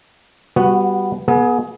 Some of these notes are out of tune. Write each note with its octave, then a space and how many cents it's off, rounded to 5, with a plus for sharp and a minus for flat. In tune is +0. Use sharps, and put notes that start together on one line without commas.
G3 +0 B3 +0 F#4 -20
B3 -25 G#4 +25